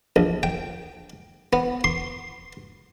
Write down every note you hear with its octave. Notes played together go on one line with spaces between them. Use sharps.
A#1
G5
B3
C6